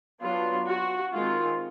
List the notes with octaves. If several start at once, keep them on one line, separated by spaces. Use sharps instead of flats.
F#3 B3 D4 F4
F#4
D#3 G#3 C4 F4